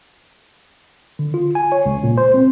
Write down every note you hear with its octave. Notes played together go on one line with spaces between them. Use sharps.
D3
F4
G#5
C#5
C#2
A#2
C5
C4